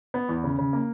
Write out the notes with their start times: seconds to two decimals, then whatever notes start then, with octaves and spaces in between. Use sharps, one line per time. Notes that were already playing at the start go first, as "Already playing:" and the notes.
0.14 B3
0.29 E2
0.44 C#3
0.59 C#3
0.73 A#3